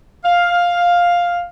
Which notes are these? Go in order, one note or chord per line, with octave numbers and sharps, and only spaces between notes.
F5